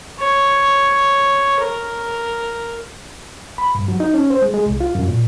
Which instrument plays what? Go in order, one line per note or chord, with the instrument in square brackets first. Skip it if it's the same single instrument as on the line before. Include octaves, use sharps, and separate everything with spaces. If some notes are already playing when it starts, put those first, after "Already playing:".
[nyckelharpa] C#5
A#4
[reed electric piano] B5
G2
F#3
D#4
C#4
C5
G#3
G#3
C2
F4
F#2
A#2